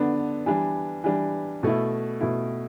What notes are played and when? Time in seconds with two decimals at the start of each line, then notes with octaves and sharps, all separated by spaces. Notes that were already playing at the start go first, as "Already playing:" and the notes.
Already playing: D3 B3 D4
0.46 E3 G3 D4
1.04 E3 G3 D4
1.63 B2 A3 E4
2.21 B2 A3 E4